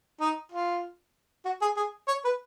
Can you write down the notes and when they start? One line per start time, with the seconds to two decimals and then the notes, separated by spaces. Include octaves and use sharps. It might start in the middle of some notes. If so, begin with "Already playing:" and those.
0.21 D#4
0.52 F4
1.45 F#4
1.62 G#4
1.77 G#4
2.08 C#5
2.25 B4